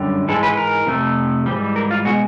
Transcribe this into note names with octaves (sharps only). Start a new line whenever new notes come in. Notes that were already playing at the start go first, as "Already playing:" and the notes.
Already playing: F#2 D3 G3
G#2 E3 G#3 A4
B4
A#4
F2 C3 F3 A3
G#2 E3 G3
A#4
F4
B2 G#3 F#4